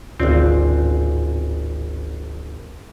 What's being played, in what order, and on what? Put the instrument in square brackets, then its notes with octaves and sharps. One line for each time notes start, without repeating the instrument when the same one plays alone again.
[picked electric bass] D1 [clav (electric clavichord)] G#1 C4 [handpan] C#4 F4 D5